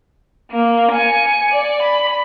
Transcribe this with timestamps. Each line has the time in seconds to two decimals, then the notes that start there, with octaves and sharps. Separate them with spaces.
0.51 A#3
0.92 G#5 C#7
1.52 D5
1.82 B5